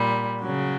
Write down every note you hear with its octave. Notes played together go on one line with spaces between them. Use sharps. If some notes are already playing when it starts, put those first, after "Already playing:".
Already playing: A#2 G3
C#3 F#3